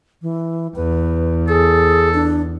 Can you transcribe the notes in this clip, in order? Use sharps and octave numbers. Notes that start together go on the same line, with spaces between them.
E3
E2 B4
G#4 A4
D4